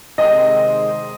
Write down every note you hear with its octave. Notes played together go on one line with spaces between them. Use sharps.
C3 D#3 G#3 C4 D#5